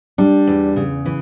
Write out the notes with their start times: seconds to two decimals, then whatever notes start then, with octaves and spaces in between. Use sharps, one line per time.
0.18 G3 D4
0.47 E2
0.76 C#3
1.06 E3